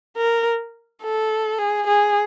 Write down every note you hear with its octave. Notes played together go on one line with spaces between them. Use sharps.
A#4
A4
G#4
G#4